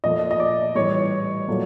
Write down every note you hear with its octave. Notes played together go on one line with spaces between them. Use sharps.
A#2 F3 A3 D#5
D#5
D5
A2 E3 G3 C#5
A#2 F#3 A3